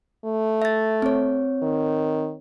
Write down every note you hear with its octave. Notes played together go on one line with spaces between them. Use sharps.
A3
E5 A6
C4 C#5
D#3